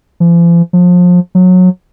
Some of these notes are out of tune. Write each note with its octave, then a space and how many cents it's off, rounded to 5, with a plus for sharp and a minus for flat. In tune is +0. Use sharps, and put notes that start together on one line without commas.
F3 -45
F3 +30
F#3 -20